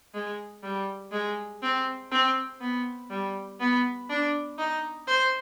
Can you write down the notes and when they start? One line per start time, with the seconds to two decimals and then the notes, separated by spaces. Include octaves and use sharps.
0.14 G#3
0.63 G3
1.12 G#3
1.62 C4
2.11 C4
2.61 B3
3.10 G3
3.60 B3
4.10 D4
4.58 D#4
5.07 C5